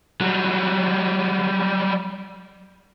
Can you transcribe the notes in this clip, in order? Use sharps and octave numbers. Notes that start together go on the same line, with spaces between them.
F#3 G3